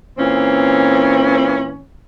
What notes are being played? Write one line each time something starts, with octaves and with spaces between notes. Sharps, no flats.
A#2 E3 C4 C#4